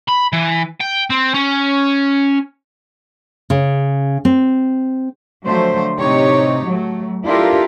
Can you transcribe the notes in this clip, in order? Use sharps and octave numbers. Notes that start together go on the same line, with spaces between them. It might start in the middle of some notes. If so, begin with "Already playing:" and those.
B5
E3
G5
C4
C#4
C#3
C4
D3 F3 F#3 A3 C5
A2 C3 D#4 G4 C#5
F#3 A3
D4 E4 F4 G4 A4 A#4